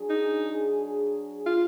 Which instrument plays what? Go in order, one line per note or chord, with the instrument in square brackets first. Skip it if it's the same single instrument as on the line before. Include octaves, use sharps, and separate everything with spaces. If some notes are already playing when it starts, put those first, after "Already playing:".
Already playing: [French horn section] F#3 D4 G#4
[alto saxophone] D#4
F4